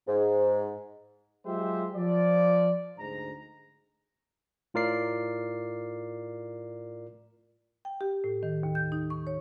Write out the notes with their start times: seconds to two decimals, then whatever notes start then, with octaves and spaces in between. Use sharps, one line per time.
0.07 G#2
1.46 F#3 G#3 F4 G4 C5 E5
1.96 F3 D5
2.98 D2 G#2 A#5
4.74 A2 F4 A#4 D5 C7
7.85 G5
8.01 G4
8.24 A2
8.43 D#3
8.63 D#2
8.75 G6
8.92 D#4
9.10 C#6
9.27 C#5